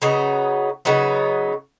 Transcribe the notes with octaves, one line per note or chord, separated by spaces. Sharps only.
C#3 F#3 B3 D#4
C#3 F#3 B3 D#4